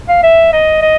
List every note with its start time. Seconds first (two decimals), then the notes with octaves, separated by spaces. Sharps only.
0.08 F5
0.23 E5
0.53 D#5
0.82 D#5